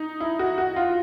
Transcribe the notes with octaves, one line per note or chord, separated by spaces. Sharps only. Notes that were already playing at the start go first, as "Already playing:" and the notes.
Already playing: D#4
E4
F#4
F#4
F4